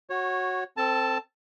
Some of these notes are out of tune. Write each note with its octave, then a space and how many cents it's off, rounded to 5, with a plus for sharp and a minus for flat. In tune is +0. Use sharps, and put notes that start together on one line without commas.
F#4 +0 C#5 -15
C4 +0 A4 +25 A5 +0